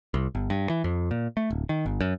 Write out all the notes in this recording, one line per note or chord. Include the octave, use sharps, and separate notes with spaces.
C2
G1
G2
E3
F2
A#2
A3
D1
D#3
G1
F#2